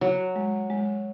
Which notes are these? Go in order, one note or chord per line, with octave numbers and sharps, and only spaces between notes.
F#3 F#4
G#3
G#3